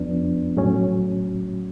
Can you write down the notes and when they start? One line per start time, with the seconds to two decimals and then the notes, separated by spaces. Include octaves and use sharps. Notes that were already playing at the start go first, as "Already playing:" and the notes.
Already playing: F2 F3 B3 D4
0.57 A2 F#3 C#4